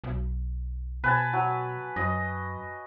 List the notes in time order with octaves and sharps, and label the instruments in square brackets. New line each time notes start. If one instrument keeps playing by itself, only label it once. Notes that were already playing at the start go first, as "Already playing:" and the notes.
[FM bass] B1
[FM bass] B2 [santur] B4 G#5 A5
[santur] F#3
[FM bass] F#2 [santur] D#5